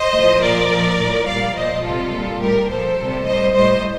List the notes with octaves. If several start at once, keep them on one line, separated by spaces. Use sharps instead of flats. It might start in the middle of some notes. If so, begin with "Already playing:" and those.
Already playing: C5 D#5
A2 F3
A#2 F3 A#4 D5
A#2 F3
A2 F3
A#2 G3 D5 F5
A#2 F3 C5 D#5
C3 G3 F4 A4
A#2 G3
A2 G3 G4 A#4
A#2 F3 A4 C5
C3 G3
A2 G3 C5 D#5
A2 G3 C5 D#5